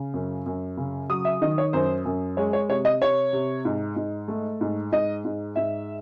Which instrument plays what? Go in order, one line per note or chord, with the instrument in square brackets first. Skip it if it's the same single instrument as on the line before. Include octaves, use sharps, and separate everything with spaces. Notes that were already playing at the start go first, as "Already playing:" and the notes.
Already playing: [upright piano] C#3
F#2
F#2
C#3
F#3 D#6
E5
D#3 D#5
C#5
F#2 C5
F#2
G#3 C#5
C#5
C3 C#5
D#5
C3 C#5
C3
G#2
G#2
A3
G#2
G#2 D#5
G#2
G#2 E5